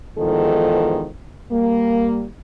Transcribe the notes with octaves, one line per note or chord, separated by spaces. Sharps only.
E2 G#2 D#3 F3 A4
G3 A#3